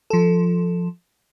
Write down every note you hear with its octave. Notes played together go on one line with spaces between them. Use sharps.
F3 A4